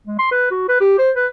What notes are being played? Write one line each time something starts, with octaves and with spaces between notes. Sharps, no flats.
G#3
C6
B4
F#4
B4
G4
C5
B4